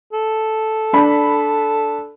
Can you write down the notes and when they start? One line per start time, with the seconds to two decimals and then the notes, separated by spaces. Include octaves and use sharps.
0.13 A4
0.93 D4 B5